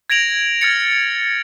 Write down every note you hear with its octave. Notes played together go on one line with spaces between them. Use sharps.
G#6 A#6 D7 F7 F#7
F6 A6 C#7